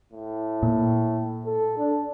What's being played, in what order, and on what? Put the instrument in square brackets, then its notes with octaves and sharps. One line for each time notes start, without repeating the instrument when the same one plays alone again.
[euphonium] A2
[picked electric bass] A#2
[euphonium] A4
D4